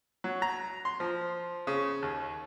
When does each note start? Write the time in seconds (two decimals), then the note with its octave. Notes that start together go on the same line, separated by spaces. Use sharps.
0.24 F#3
0.42 A#5
0.85 C6
1.00 F3
1.67 C#3
2.02 D#2